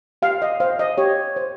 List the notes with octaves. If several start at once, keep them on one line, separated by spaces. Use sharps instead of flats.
G4 F5
D#5
C5 F5
D#5
G4 C#5
C5